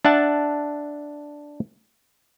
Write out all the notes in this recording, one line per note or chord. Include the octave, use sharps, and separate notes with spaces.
D4 E5 F#5 A5